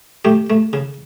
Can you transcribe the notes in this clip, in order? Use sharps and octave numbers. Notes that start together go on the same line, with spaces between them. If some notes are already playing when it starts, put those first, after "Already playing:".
A3 G4
A3
C#3